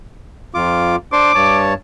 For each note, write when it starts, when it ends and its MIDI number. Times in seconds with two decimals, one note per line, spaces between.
0.54 0.96 41
0.54 0.96 65
0.54 0.96 86
1.13 1.32 62
1.13 1.32 72
1.13 1.32 84
1.13 1.58 86
1.35 1.74 43
1.35 1.74 73
1.35 1.74 81